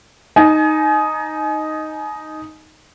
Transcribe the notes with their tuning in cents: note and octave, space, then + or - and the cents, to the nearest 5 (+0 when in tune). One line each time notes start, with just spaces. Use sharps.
D#4 +0 G#5 +35